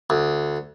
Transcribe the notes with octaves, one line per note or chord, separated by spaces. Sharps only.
D2